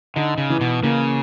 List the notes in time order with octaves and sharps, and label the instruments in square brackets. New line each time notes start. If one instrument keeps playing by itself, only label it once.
[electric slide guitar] D3 [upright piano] D#4
[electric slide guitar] C#3
[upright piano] E3
[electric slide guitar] B2
[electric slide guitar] C#3 [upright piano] A#3